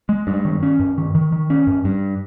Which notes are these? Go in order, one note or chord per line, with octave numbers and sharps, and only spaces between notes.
G#3
G2
D#3
C#4
G2
D#3
D#3
D#3
C#4
G2
G2